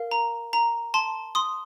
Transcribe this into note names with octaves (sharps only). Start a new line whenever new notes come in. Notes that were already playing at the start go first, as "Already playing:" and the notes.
Already playing: A#4 F5
A#5
A#5
A5 C6
C6 D#6